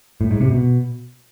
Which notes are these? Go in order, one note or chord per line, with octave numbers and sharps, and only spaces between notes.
A2
G#2
C3
B2